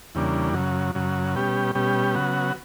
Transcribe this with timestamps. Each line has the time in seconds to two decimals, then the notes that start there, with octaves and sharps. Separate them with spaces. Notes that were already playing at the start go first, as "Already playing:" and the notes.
0.15 E2 C#3 G3 A#3 D4
0.54 F#2 C#3 F#3
0.95 F#2 C#3 F#3
1.35 B2 G3 C#4 G4
1.75 B2 G3 C#4 G4
2.15 C#3 F#3 B3 F#4